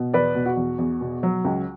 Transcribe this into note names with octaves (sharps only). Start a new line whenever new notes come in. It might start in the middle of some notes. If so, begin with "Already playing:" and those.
Already playing: B2
E2 B4 D5
B2
F#4
E2
E2
B2
F#3
C#2